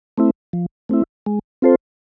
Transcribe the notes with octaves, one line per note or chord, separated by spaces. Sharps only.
A3 C4 E4
F3
A3 C4 E4
G#3
C4 F4 A4 C5